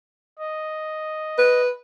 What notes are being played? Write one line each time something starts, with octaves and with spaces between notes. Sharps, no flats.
D#5
B4